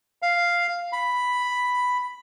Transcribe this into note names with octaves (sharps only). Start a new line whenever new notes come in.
F5
B5